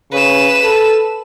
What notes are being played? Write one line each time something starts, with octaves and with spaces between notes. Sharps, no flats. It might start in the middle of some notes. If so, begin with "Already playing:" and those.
C#3 B4 E7
A4